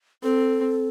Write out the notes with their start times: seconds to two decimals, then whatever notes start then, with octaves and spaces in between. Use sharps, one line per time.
0.23 C4 A4